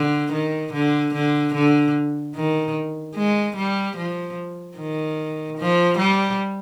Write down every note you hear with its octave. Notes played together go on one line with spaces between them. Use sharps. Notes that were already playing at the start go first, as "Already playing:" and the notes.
Already playing: D3
D#3
D3
D3
D3
D#3
G#3
G3
F3
D#3
F3
G3